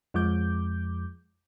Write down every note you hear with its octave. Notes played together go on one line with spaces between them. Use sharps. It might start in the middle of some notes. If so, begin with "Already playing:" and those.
F2 F3 G#3 D6 G6